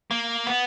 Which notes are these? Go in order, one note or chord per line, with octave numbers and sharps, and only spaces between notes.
A#3
B3